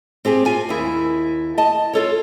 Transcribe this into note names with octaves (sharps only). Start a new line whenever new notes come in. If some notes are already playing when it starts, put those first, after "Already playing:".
C4 G4 G#4 G#5
F4 G#5
D#2 E4
D#5 A5
F4 A4 C#5